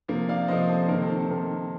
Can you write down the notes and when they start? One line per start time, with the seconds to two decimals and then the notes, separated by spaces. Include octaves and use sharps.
0.08 C3 F3 A#3
0.29 D5 F5
0.48 C3 F3 A#3 C5 D#5
0.69 A4 C5
0.88 C3 D#3 A#3 A#4
1.02 A4 C5
1.29 C3 D#3 A#3